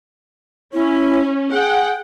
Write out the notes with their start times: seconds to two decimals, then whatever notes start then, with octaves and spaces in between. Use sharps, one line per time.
0.74 C#4 E4
1.52 G#4 F#5 G5